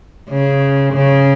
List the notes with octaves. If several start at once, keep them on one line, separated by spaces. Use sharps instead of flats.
C#3
C#3